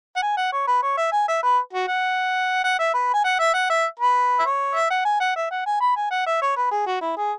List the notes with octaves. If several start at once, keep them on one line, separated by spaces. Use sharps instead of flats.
F#5
G#5
F#5
C#5
B4
C#5
E5
G#5
E5
B4
F#4
F#5
F#5
E5
B4
G#5
F#5
E5
F#5
E5
B4
E5
C#5
E5
F#5
G#5
F#5
E5
F#5
G#5
B5
G#5
F#5
E5
C#5
B4
G#4
F#4
E4
G#4